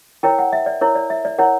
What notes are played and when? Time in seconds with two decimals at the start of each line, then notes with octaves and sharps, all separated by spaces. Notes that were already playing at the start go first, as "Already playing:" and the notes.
0.23 E4 A#4 C#5 G5
0.39 F#5
0.53 E5
0.66 D5
0.81 E4 A#4 C#5
0.95 D5
1.10 E5
1.25 D5
1.38 E4 A#4 C#5 F#5